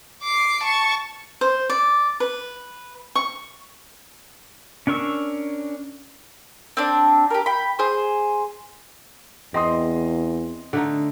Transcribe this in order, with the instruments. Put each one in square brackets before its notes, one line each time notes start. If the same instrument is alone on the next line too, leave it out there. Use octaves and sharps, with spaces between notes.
[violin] D6 C7
A5 C#6
[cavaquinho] C5
D5
B4
C#6
[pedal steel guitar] C#4 D4 A#4 C#6 E6
[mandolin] C4 D4
G4 A#4
G5 B5
G#4 C5
[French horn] E2 [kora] C4 [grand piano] D#5 C6 D#6
[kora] D3 A3 D#4